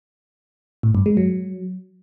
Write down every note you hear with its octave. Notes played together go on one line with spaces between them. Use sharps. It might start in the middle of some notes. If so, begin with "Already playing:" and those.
A2
G2
G#3
F#3